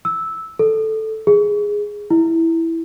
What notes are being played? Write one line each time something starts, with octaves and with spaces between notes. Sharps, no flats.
E6
A4
G#4
E4